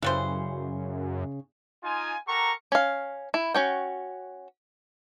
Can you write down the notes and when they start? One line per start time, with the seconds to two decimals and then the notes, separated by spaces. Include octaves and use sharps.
0.02 F#2 C#3 E3 G3 C5
1.83 D#4 F4 G#5
2.28 G4 A4 A#4 F#5 A#5 C#6
2.72 C#4 F5
3.34 E4
3.54 C#4 F#4 G5